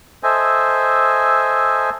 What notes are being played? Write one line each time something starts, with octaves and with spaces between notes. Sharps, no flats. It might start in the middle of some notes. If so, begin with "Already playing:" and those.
A4 C5 D#5 E5 G#5